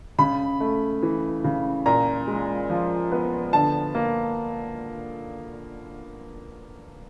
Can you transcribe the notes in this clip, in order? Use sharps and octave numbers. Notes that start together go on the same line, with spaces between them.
C#3 B5
A3
E3
C#3
A#2 A#5
G#3
F3
B3
D3 A5
A#3